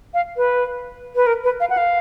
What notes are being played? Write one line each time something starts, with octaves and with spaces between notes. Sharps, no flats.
F5
B4
B4
A#4
B4
F5
F#5
F5